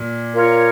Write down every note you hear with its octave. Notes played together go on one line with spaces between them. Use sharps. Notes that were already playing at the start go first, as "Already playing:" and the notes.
Already playing: A#2
F4 A#4 C#5